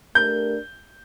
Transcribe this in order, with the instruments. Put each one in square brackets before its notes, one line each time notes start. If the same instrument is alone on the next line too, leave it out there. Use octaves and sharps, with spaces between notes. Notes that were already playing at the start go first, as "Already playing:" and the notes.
[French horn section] A3 D4 G4 A#4 [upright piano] G6